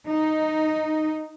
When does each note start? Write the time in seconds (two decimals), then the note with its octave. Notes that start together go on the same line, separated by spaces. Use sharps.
0.08 D#4